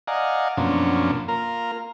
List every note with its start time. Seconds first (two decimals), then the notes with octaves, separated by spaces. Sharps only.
0.08 D5 D#5 F5 F#5 G#5 A#5
0.57 F#2 B2 F3 A#3 C#4 D4
1.28 A#3 F4 A#4 A#5